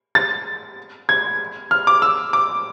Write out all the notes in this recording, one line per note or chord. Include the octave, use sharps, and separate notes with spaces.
A6
G#6
F6
D6
E6
D6